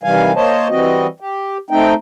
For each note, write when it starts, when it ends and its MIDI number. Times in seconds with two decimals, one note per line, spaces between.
0.03 0.32 48
0.03 0.32 51
0.03 0.32 52
0.03 0.32 55
0.03 0.32 77
0.03 0.32 80
0.36 0.68 58
0.36 0.68 72
0.36 0.68 73
0.36 0.68 75
0.36 0.68 81
0.70 1.07 52
0.70 1.07 55
0.70 1.07 60
0.70 1.07 66
0.70 1.07 75
1.20 1.57 67
1.70 1.94 57
1.70 1.94 60
1.70 1.94 63
1.70 1.94 79